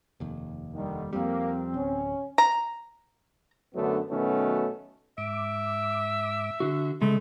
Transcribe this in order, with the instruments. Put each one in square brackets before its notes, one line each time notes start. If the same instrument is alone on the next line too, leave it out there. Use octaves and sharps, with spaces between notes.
[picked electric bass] F1 D#2
[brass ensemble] D3 D#3 [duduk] G3
[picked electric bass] F2 G3 [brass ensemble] A#3 [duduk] C4
[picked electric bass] D1 [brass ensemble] C#4
[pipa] A#5
[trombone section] F#2 D3 F#3 A3 B3 D4
B2 D#3 F#3 A3 B3 C#4
[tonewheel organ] G#2 D6 [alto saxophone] E5
[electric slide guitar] D3 F#4
[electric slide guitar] C#3 G#3 [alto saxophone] A3